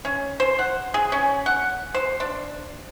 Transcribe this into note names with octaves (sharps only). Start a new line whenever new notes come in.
C#4
C5
F#5
G#4
C#4
F#5
C5
D4